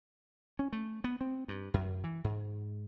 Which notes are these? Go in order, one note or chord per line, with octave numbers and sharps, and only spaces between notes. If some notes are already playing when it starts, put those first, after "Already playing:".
C#4
A3
B3
C4
G2
F#2
E3
G#2